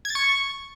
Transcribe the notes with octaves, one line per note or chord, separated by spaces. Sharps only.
G#6
A6
C#6